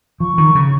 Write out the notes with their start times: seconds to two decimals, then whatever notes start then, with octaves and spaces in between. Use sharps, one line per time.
0.20 F3 C#6
0.38 D#3
0.55 C#3